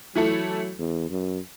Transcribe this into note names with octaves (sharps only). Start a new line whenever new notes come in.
E3 F#3 A3 E4 A4
E2
F#2